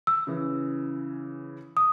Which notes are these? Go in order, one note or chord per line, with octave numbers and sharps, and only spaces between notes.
E6
C#3 E3
D#6